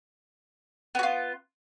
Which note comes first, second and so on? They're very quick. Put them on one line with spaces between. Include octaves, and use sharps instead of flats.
B3 F#4 F4